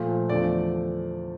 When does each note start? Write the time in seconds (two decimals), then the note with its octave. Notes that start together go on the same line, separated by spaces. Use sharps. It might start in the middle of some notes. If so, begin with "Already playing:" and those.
Already playing: A#2 F3 A3
0.29 E2 D3 F3 A3 D5